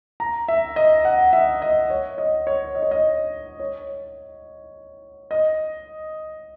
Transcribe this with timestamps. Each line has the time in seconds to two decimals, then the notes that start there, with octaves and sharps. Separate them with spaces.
0.20 A#5
0.48 E5
0.76 D#5
1.05 F#5
1.33 E5
1.62 D#5
1.90 C#5
2.18 D#5
2.47 C#5
2.75 D#5
2.82 C#5
2.91 D#5
3.60 C#5
5.31 D#5